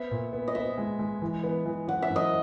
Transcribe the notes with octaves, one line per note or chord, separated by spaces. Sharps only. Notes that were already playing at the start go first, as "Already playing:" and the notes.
Already playing: B3 E5
A#2
B3
D#5
B3 E5
G#3
G#3
E3
B3
E3
E3 F#5
E5
F#2
D#5